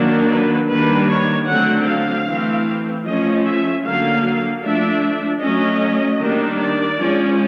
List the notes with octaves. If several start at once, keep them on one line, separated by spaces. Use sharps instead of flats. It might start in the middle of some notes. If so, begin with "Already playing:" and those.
Already playing: D#3 F#3 A#3 D4
B4
D#3 G3 A#3 D4 B4
C#5
D3 F#3 A3 C4 F#5
F5
E3 A3 C4
F3 A3 C#4 D#5
E5
D3 F#3 A#3 F5
F3 A3 D4 E5
F#3 A3 C#4 D#5
D#3 G3 A#3 D4
D5
F3 G#3 C#4